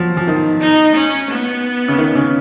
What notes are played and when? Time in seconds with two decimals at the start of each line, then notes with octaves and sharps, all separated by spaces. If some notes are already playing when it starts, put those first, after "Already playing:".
Already playing: F3 F#3
0.17 F3
0.28 D#3
0.62 D#4
0.95 C#4
1.30 B3
1.88 C#3
1.98 D#3
2.15 C#3